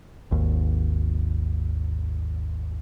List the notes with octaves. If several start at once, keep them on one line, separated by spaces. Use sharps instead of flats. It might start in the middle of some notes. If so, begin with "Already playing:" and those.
G#1 D#2